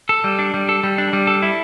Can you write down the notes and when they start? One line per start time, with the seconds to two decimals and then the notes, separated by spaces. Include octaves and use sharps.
0.09 A4
0.24 G3
0.39 D4
0.54 G3
0.69 A4
0.83 G3
0.98 D4
1.13 G3
1.27 A4
1.42 E4